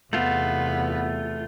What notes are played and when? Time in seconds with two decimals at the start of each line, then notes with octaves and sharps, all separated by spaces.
0.13 E2 C3 A3 B3 F4